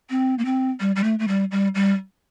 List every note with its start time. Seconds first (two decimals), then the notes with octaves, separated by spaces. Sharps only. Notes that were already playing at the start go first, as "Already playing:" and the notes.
0.10 C4
0.38 A#3
0.45 C4
0.80 G3
0.96 G3
1.04 A3
1.19 A3
1.28 G3
1.51 G3
1.75 G3